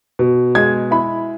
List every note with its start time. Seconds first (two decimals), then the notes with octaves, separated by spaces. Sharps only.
0.19 B2
0.55 G#3 G#6
0.91 E4 B5